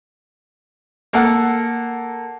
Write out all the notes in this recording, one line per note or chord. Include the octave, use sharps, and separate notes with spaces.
A#3 A4 F#5